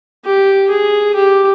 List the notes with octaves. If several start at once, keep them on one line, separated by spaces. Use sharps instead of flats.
G4
G#4
G4